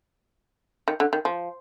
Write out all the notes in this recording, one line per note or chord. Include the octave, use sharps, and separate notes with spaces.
D#3
D3
D#3
F3